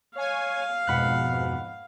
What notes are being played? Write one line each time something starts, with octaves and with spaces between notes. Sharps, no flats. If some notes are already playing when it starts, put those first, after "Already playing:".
C#5 F5 G#5
F2 G#2 B2 F#5 B5 F#6